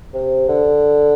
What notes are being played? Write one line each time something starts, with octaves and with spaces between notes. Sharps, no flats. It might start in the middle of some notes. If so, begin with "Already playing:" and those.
C3
D3